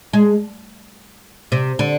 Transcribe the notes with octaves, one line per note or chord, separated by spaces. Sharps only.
G#3
C3
D3